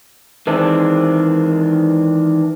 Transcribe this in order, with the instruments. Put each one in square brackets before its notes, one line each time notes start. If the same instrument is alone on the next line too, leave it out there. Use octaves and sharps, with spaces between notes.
[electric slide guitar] D#3 E3 G#3 C4 D4